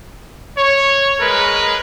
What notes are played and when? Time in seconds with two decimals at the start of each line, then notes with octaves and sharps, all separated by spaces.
0.57 C#5
1.20 G#3 A#4 B4